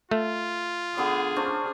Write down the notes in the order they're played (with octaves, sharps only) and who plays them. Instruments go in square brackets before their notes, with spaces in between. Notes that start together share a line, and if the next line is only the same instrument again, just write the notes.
[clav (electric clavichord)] A3 [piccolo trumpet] F4
[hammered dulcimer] D3 B3 D5 [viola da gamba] G#4
[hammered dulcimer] C#4 D4 C5